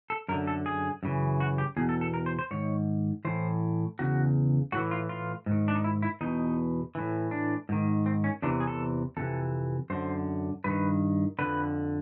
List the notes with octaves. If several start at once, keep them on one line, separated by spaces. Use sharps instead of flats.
A4
F#2 D3 A#4
A4
G#4
F#2 C#3 E3
F#4
G4
E2 B2 G#4
A4
A4
A#4
C5
C5
G#2 D#3 C#5
A2 E3 C5
E2 C#3 F#4
A2 E3 F#4
F4
F4
G#2 D#3
D4
D#4
E4
E4
E2 B2 D#4
A2 E3
D4
G#2 D#3
C4
C#4
E2 C3 E3 D4
G#4
A4
F2 C3 E3 A4
F#2 D3 C5
G2 D#3 B4
F2 D3 B4